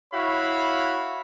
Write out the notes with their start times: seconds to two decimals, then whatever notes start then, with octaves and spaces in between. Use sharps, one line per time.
0.13 E4 F#4 C#5 F5 B5